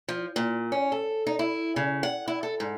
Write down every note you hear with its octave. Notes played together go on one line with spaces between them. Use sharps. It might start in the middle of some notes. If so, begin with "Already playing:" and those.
F3
A#2
C#4
A4
D#4
E4
C#3
F#5
E4
A4
G#2